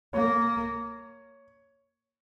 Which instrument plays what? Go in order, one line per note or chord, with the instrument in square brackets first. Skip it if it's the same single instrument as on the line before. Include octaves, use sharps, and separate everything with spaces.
[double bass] A#3 [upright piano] C#5